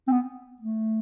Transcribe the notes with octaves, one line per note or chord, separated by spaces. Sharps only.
C4
B3
A3